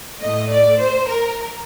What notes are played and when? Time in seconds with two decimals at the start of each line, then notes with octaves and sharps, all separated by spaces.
0.21 A2 A3 D#5
0.50 D5
0.79 C5
1.07 A#4